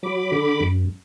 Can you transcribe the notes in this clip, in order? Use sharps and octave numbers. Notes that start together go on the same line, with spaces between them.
F#3 B5 D6
D3
F#2